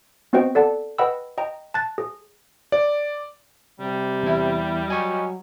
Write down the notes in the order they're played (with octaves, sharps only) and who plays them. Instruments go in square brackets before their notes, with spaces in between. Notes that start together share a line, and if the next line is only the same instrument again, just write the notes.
[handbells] B3 C4 F#4 C5 D#5 G5
A4 D5 F#5 A5
B4 D#5 F#5 G5 B5 E6
D#5 G5 A#5
A5 F#6 A6
G#4
[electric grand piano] D5
[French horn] C3 [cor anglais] G3
[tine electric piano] E2 E4
[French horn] F#3 [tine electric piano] D#5 G#5 C#6